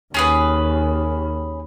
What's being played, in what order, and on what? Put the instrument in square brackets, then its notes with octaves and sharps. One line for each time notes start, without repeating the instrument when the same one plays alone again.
[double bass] D#2 [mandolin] C#4 G#4 B4